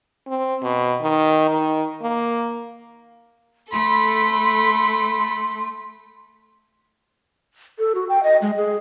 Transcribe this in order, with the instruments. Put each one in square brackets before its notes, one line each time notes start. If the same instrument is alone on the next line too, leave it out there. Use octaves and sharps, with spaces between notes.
[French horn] C4
B2
D#3
D#3
A#3
[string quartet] A3 [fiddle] A4 B5 [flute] C6
[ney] A4
F#4
G5
D#5
G#3
G#4